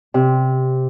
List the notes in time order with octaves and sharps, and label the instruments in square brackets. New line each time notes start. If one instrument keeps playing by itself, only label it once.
[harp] C3